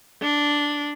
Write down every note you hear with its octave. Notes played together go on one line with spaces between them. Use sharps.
D4